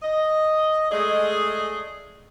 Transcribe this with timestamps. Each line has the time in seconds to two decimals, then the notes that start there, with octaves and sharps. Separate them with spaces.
0.03 D#5
0.91 G#3 A3 G#4 D5 D#5